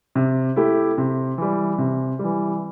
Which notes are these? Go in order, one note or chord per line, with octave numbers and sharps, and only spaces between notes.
C3
A3 E4 G4
C3
E3 G3
C3
E3 G3